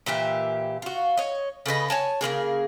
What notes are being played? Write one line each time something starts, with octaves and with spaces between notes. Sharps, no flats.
A#2 E3 G4 E5
F4 F#4
C#5 D#5
C#3 A4 B4 D#5
C#5 G#5 A5
C#3 G3 A#3 G#4